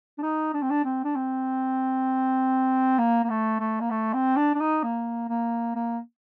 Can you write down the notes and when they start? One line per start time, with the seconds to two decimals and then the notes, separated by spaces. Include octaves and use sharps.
0.18 D4
0.22 D#4
0.53 D4
0.62 C4
0.70 D4
0.84 C4
1.04 D4
1.15 C4
2.98 A#3
3.24 A#3
3.30 A3
3.59 A3
3.80 A#3
3.90 A3
4.13 C4
4.37 D4
4.55 D4
4.60 D#4
4.83 A#3
5.28 A#3
5.75 A#3